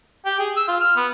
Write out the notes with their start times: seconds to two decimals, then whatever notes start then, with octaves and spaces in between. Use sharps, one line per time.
0.25 G4
0.39 G#4
0.56 E6
0.68 F4
0.80 F6
0.96 B3